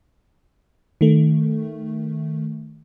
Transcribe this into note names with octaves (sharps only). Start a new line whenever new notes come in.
D#3 A3